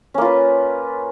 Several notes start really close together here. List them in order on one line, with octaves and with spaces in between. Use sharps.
C#4 A#3 F4 B4